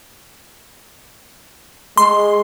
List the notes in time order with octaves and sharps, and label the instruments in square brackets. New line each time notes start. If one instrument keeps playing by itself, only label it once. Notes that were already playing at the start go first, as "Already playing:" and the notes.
[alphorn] G#3 [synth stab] C6